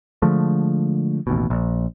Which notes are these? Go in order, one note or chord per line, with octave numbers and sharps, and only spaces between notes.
D3 F3 G#3 A3
A1 D#2 B2
A#1